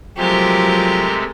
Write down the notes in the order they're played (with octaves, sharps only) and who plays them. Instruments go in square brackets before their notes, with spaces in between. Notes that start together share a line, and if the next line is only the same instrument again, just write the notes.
[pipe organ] C3 G#3 A3 [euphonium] F3 [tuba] F#3 [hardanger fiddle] G4 A#4